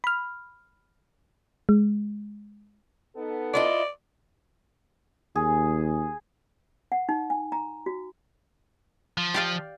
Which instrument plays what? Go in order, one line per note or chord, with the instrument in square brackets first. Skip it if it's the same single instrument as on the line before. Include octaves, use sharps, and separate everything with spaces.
[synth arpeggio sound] B5 F6
G#3
[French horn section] B3 D#4 A4
[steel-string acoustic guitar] E4 F4 D#5 [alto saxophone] D5
[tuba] D#2 [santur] G#4
[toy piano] F#5
D#4
G#5
A#5
F#4
[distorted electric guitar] F3
[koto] G4 D5 F5